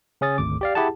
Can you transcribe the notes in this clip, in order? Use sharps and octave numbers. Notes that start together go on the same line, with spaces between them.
C#3 C#4 D#6 A6
G#1 D2 D6
G4 D5 F5
E4 G4 G#4 F#5 A5